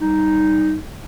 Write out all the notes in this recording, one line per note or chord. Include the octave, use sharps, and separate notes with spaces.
G3 D#4